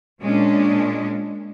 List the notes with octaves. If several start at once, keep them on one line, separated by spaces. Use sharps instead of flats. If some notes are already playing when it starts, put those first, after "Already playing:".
A#2 G#3 C#4 D4